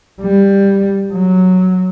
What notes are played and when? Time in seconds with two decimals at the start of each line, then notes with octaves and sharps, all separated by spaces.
0.21 G3
1.12 F#3